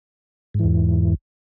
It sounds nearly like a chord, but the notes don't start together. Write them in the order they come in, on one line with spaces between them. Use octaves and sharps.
G#2 E3 E2